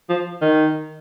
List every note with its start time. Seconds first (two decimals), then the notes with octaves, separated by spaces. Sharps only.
0.09 F3
0.42 D#3